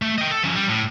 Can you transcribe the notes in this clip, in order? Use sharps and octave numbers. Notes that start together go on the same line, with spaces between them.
A3
D#5 G5
A4
F3 C#4
G3
A2